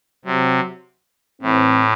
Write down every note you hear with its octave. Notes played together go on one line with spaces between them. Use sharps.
C3 F#3 C4 G4
A2 E3 A3 C4